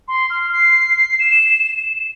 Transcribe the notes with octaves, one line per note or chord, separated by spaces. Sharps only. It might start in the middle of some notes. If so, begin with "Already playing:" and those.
C6
F6
C7
E7